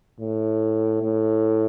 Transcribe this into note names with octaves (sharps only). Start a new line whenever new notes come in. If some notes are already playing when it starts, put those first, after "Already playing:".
A2
A2